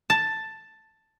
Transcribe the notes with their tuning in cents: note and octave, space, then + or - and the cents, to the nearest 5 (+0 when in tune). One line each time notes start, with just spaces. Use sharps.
A5 +5